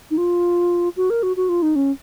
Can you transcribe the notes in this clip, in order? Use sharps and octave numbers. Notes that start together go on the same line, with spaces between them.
D#4
F4
F#4
A#4
F#4
F#4
F4
D#4
C#4